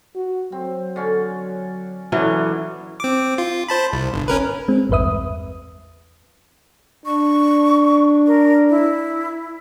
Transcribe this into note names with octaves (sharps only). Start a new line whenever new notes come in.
F#4
F#3 C4
D3 C#4
A#2 E3 F#3 C#4 D4 A4
C4 D6
F4
C5 A5 B5
C2
G1
C#4 A#4 B4
G#3 C4
A1 E2 G2 B4 E5 D#6
D4 C#6
A#4
E4